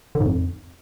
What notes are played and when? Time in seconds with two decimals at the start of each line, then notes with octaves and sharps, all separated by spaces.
0.15 D3
0.20 G#2
0.26 F2